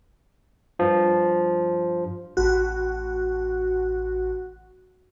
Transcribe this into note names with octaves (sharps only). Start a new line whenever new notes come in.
G2 F3
A1 F#4